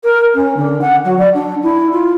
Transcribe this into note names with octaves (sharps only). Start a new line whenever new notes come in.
A#4
C#4
D3
F#5
F#3
D5
D4
E4
F4